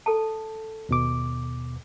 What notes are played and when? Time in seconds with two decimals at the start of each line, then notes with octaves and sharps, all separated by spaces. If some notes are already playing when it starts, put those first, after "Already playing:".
0.06 A4 A5
0.89 D#2 B2 D6